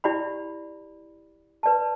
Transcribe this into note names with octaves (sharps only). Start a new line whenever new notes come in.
E4 G4 D5 F#5 B5
B4 D5 A5